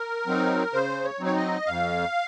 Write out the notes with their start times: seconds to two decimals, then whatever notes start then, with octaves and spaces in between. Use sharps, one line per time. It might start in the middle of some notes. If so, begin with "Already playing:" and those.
Already playing: A#4
0.27 F#3 C4 D#4
0.73 C#3 C5
1.04 C#5
1.20 F#3 C4 D#4
1.26 C#5
1.36 D#5
1.66 F2 F5